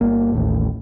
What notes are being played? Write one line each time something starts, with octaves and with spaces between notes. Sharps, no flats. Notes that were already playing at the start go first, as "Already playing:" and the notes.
G1 A#3
A1 D#2 A2